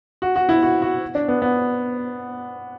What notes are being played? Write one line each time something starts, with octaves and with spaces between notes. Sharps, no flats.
F#4
F#4
E4
F#4
F#4
D4
B3
B3